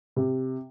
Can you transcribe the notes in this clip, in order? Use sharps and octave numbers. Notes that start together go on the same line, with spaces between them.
C3